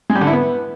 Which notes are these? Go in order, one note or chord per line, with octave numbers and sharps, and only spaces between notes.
G#3
G3
D3
E4
B3